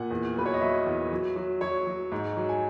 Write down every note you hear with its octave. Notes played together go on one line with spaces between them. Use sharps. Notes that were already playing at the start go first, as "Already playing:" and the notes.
Already playing: A#2 F#5
E2
F#3 B4
C#5
D#5
F#3 E5
E2
F#3
F#3
F#3 C#5
F#3
G#2
F#3
G#5